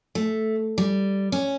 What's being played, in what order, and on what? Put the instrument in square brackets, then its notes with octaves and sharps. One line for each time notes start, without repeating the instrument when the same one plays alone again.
[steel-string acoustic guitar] A3
G3
C#4